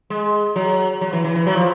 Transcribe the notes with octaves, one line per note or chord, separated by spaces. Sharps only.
G#3
F#3
F#3
E3
E3
E3
F#3
F3